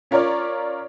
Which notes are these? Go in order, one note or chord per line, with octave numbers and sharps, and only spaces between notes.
C#4 F4 A#4 C#5 D5